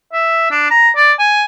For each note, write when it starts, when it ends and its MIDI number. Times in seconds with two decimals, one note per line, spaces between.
0.13 0.51 76
0.51 0.67 62
0.71 0.90 82
0.96 1.13 74
1.19 1.45 80